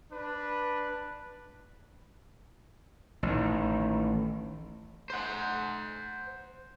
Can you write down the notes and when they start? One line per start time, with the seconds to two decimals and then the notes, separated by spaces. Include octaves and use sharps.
0.11 D4 B4
3.23 A1 D#3
5.10 C5 F#5